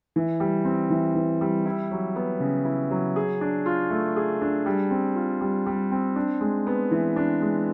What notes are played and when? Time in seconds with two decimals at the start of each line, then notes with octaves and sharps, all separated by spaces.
0.16 E3
0.40 G3
0.65 C4
0.90 E3
1.15 E3
1.41 G3
1.66 E4
1.91 F#3
2.16 B3
2.40 C#3
2.65 E4
2.91 F#3
3.16 G#4
3.41 D4
3.66 F4
3.90 A3
4.16 G#4
4.42 D4
4.66 G3
4.91 C4
5.15 F4
5.41 G3
5.66 G3
5.92 C4
6.16 D4
6.41 G#3
6.67 B3
6.91 E3
7.16 D4
7.42 G#3